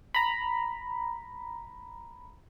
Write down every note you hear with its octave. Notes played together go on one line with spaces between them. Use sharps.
A#5 B5